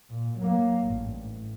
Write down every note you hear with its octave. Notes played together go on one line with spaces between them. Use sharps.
A#2
F#3 A#3
A1 G2
A2